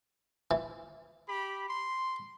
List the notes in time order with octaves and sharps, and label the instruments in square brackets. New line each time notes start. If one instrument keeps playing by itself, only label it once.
[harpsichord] E3
[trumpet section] G4 B5
C6